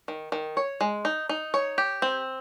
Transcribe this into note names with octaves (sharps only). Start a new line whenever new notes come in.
D#3
D#3
C#5
G#3
D#4
D#4
C#5
G4
C4